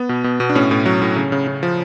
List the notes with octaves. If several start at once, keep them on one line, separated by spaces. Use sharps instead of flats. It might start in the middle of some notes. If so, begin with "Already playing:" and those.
Already playing: B3
B2
B2
B2
D4
A2 C#4
A2
F#3
A2
C#3
C#3
C#3
F3